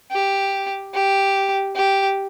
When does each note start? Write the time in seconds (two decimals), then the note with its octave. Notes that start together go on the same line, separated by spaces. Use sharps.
0.11 G4
0.94 G4
1.76 G4